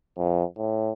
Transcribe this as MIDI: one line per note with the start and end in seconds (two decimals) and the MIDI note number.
0.17 0.44 41
0.57 0.92 45